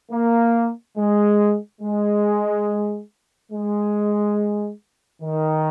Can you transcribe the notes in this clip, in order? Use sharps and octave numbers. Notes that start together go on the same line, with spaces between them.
A#3
G#3
G#3
G#3
D#3